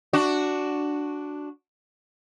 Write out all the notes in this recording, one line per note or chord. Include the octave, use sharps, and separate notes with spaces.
D4 F#4